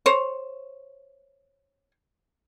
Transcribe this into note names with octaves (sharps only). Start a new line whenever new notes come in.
C5 C#5